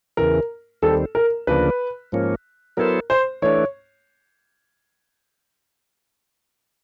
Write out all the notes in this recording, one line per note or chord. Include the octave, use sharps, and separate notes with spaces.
E2 C#3 E3 A#4
D#2 D#3 G3 C4 A4
A#4
D2 C#3 F3 A#3 D4 B4
G#2 F3 A#3 C#4
F#3 B3 E4 A4 A#4 C5
C5
E3 A3 D4 C#5